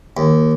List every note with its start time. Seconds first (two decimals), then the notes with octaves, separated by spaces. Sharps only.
0.17 D#2